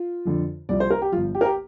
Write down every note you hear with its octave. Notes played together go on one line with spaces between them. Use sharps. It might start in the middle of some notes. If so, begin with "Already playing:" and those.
Already playing: F4
F2 D3 F3
C2 C3 F3 D5
C5
A#4
G4
G1 G2 F3 F4
G4
A#4
G4